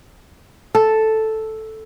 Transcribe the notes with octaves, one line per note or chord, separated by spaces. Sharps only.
A4